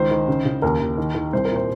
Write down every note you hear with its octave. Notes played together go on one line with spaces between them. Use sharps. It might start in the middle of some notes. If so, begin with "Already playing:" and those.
Already playing: C#2 D#3 C5
D#3
C#3
C#3
D#2 A#4
D#2
D#3
D#3
C2 C5
A#4
A#2
C5